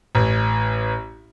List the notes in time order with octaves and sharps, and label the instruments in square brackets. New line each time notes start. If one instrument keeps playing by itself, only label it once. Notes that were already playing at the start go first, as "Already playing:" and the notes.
[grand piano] A1